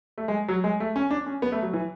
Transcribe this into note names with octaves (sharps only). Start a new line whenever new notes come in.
A3
G#3
F#3
G#3
A3
C#4
D4
C#4
B3
A3
F#3
E3